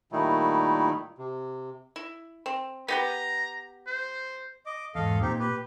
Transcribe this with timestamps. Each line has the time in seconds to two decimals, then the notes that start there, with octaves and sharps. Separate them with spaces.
0.12 A#2 D#3 G3 A3 D#4 E4
1.18 C3
1.96 E4
2.46 C4
2.88 B3 G4 B4 A#5
3.87 C5
4.66 D#5 D6
4.95 E2 G#2 A4 D#5 F5
5.21 A#2 C4 D#4 G4
5.39 G4 B4